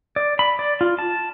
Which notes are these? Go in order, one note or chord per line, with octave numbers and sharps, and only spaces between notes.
D5
B5
D5
F4
A5